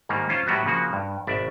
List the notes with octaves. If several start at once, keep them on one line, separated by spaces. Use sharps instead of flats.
G#2 D#3 G3 A#3
C#4 F4 C5 F5 A5
A2 F#3 G3 B3 F#4
C#3 F3 A#3 F#4
G2
G#1 B2 D5 E5